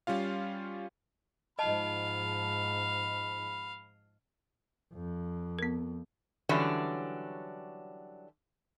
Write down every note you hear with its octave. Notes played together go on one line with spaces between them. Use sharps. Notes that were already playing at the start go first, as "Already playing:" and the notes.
G3 C#4 F4 F5
G#2 F3 D#5 F5 A5 B5
F2
B3 A#4
D3 E3 F#3 G3 C#4 D4